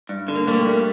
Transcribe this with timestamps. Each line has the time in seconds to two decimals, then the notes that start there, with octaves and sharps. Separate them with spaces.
0.09 G2
0.28 D3
0.36 A#3
0.47 G3 A3 A#3
0.66 G2